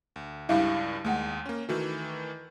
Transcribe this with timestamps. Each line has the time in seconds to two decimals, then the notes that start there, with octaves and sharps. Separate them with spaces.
0.16 D2
0.49 C#2 G2 G3 E4 E5 F5
1.05 D#2 G#3 A3 F#5
1.46 A#3 C#4
1.69 D#3 E3 A3 F#4